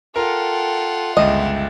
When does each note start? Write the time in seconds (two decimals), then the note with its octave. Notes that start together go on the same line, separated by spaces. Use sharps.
0.16 F4 A4 A#4 F#5 G5
1.17 G1 C#2 D#5 E5 G5